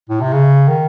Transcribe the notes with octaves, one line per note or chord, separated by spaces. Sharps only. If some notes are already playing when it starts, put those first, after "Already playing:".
A2
C3
C#3
D#3